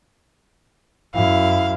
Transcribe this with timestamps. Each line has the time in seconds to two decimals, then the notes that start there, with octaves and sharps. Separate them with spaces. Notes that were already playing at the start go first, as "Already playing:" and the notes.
1.15 F#2 E4 F5